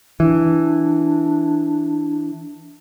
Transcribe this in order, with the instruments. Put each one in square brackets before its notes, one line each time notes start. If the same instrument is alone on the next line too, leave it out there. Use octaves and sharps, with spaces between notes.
[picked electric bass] E3 [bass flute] D4